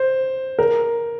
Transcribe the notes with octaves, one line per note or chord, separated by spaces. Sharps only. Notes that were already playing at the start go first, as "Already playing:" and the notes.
Already playing: C5
A#4